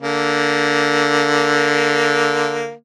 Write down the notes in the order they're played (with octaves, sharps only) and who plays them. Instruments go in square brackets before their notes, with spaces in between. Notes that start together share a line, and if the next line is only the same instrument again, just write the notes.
[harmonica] D3 A#3